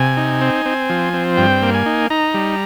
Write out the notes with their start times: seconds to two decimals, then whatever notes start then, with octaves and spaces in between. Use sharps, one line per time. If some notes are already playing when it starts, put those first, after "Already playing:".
Already playing: C3 G#5
0.17 D#4
0.41 C4
0.66 C4
0.90 F3
1.13 C4
1.37 G2 G5
1.62 A#3
1.74 G#5
1.86 D#4
2.10 D#4 A#5
2.34 G3